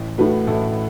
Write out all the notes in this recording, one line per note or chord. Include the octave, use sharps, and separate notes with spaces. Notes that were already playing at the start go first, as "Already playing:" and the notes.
Already playing: A1
A2 A3 F#4 B4
A1 E4 A4